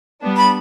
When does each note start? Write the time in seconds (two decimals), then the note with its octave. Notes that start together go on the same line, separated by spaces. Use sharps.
0.22 G3 B3 D4
0.37 B5